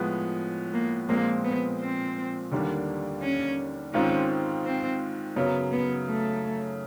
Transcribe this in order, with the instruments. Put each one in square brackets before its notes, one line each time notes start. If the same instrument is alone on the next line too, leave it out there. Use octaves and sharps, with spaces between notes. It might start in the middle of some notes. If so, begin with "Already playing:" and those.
Already playing: [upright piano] A2 F3 G#3 B3
[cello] A#3
[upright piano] A#2 F3 G#3 C4 [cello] A#3
[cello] B3
C4
[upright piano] D#2 D3 G3 A#3 D4
[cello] C#4
[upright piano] G#2 D#3 G#3 C4 F4 [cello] C#4
[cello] C4
[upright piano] F#2 C#3 F#3 [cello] B3
[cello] B3
A3